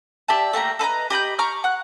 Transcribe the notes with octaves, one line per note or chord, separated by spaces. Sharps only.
G4 D5 E5 A5
A3 A#3 G4 A#5
A4 B4 D#5 A#5
G4 D#5 B5 G6
A#5 C#6 D6 F6
F#5 F#6